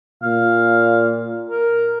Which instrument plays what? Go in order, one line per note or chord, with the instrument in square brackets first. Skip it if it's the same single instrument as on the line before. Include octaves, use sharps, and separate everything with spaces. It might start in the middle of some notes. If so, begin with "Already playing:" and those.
[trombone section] A#2 [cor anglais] F5
[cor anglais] A#4